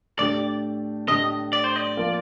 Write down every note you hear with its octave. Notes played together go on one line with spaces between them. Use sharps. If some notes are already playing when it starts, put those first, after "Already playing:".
A2 A3 D4 G4 D5
A2 A3 D4 G4 D#5
D5
C5
D5
F3 A#3 F4 A#4